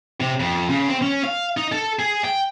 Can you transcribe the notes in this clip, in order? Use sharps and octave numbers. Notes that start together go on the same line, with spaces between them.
C3
F2
C#3
C4
C#4
F5
D#4
A4
G#4
G5